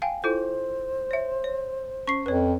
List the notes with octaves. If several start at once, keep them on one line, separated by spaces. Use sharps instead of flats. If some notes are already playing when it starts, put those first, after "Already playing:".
F5 G5 G#5
E4 F4 A4 C5
C#5 E5
C#5
C#4 C#6 C7
F2 B4 C#5